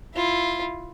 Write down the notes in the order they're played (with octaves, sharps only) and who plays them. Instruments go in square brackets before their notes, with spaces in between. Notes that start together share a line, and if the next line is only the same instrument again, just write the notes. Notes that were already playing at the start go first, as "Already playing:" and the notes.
[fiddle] E4 F4